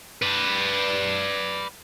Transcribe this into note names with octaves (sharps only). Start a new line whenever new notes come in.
B4 D5